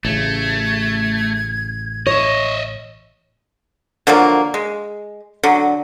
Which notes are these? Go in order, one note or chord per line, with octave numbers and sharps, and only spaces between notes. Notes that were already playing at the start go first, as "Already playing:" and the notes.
A1 C#3 A3 G#6
C#5 D#5 E5
D3 F3 F#3 A#3
G#3
D3 F#3